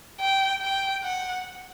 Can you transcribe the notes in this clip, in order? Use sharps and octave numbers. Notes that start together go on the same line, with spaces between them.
G5
G5
F#5